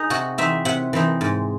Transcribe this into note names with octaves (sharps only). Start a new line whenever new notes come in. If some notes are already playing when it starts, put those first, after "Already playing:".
Already playing: D#4 G#4
C3 F#4
E3 C4 D#4 E5
C3 F#5
E3 C4 D#4
G#2